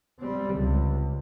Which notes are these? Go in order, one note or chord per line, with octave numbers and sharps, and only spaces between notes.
G3 C4
C#2